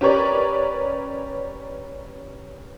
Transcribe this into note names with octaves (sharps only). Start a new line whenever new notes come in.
C#4 G4 A#4 B4 C#5 D5